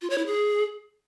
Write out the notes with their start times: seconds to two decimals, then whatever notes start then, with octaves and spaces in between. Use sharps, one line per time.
0.02 F4
0.10 C#5
0.18 E4
0.26 G#4